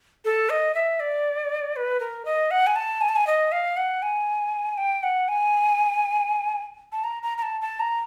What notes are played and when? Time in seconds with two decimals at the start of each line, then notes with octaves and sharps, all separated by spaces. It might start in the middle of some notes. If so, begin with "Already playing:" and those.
0.25 A4
0.50 D#5
0.75 E5
1.00 D5
1.76 B4
2.00 A#4
2.25 D#5
2.51 F#5
2.67 G#5
2.76 A5
3.01 G#5
3.09 A5
3.16 G#5
3.27 D#5
3.52 F5
3.77 F#5
4.02 G#5
4.78 G5
5.03 F#5
5.28 G#5
6.92 A5
7.04 A#5
7.23 A#5
7.38 A#5
7.43 A5
7.61 A5
7.80 A#5